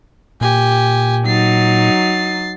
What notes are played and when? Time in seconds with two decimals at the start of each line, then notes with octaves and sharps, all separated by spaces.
0.41 A#2 G4 G#5
1.26 F#3 D#4 A6 C7